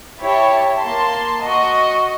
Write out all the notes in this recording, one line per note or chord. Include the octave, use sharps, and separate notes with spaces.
E4 G4 C#5 A5
A#3 A5 C6
F#4 D#5